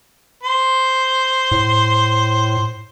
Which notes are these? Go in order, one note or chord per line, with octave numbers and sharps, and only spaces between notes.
C5
A2